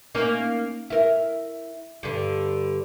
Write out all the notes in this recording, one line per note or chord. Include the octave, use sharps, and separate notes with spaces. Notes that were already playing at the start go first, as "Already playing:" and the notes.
A#3 C#4 D#4
E4 A#4
G2 D3